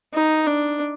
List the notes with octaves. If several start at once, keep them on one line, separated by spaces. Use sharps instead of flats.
D#4
D4